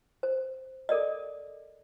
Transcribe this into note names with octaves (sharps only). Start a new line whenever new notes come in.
C5
A4 A#4 D5 D#5